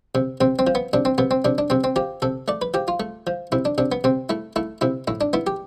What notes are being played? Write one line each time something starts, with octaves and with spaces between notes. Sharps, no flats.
C3
C3 C4
C4
F3
B3
C3 D4
C4
C3 B3
C4
C3 D4
D4
C3 C4
C4
F3 G4
C3 A4
A3 D5
B4
F3 G4
F4
A3
F3
C3 E4
D4
C3 D4
B3
C3 C4
A3 E4
A3 E4
C3 E4
A2 E4
D4
B3 E4
G4